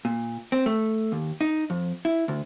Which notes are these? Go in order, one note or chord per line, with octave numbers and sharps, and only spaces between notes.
A#2
C4
A3
D#2
D#4
F2
E4
D2